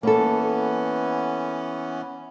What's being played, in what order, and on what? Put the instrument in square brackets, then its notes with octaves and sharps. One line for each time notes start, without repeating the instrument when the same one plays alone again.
[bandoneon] E3 B3 C#4 [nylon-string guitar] A#3 A4